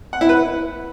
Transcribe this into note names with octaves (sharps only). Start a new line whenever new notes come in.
F#5
E4
B4